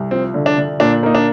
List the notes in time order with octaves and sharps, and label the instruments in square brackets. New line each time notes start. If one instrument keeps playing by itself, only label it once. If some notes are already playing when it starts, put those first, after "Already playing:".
Already playing: [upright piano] C2
[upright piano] F3 [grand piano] C4
[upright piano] D3
[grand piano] D4
[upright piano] D3
[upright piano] A#2 [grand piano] D4
[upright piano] A#3 [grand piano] D#4
[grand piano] D4